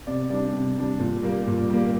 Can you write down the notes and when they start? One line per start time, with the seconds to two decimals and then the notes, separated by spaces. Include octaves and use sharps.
0.07 C3 D5
0.30 G3 D4 D5
0.53 C3
0.77 G3 D4
1.00 A#2
1.23 G3 A#3
1.47 A#2
1.70 G3 A#3